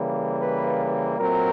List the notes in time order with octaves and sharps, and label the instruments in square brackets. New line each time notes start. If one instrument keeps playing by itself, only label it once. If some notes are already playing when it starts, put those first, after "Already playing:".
Already playing: [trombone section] C#3 E3 G3 A#3
B4
A#2 F#3 A3 C4 A#4